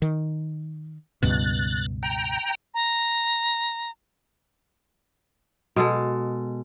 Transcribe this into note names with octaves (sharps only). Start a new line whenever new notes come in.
D#3
C#2 G2 B2 F#6 A6
G5 A#5
A#5
B2 G#3 A4